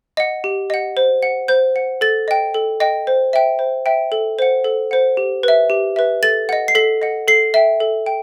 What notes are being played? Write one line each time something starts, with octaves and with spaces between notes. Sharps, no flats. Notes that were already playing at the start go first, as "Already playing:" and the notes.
D#5 F#5
G4
D#5 F#5
C5
F#5
C5 G6
F#5
A4 A6
D#5 G5
A4
D#5 G5
C5
E5 G5
C5
E5 G5
A4
C5 F#5
A4
C5 F#5
G4
B4 E5
G4
B4 E5
A4 A6
D#5 F#5
C7
A4 B6
D#5 F#5
A4 C7
E5 G5
A4
G5